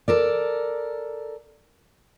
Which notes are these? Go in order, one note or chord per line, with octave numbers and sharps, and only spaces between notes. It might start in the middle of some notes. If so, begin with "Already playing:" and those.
A4 A#4 D5